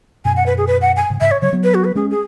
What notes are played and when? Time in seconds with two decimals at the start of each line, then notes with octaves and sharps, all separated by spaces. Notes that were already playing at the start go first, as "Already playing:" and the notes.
0.25 F#2 B2 G#5
0.36 F#5
0.46 B4
0.58 G#4
0.67 B4
0.82 F#5
0.96 G#5
1.10 G#2 C#3
1.21 G#2 C#3 E5
1.31 C#5
1.42 C#3 F#3 C#5
1.53 F#3 B3
1.64 B4
1.74 F#4
1.84 B4
1.95 G#3 C#4 G#4
2.10 G#4